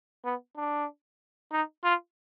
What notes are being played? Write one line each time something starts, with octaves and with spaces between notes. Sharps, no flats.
B3
D4
D#4
F4